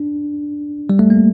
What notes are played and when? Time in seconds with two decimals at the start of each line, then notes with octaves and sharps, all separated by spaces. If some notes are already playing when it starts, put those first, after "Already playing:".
Already playing: D4
0.90 G3
0.99 A3
1.10 A#3